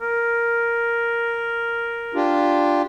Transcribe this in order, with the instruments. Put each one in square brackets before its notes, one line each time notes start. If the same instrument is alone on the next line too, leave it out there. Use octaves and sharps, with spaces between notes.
[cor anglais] A#4
[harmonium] D4 F4 G4